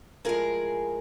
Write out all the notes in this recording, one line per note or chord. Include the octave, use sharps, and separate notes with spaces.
A2 F3 G#3 G#4 A#4